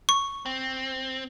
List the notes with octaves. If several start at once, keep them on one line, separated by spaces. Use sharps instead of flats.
C#6
C4